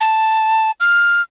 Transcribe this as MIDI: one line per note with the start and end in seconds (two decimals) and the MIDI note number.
0.01 0.71 81
0.80 1.21 89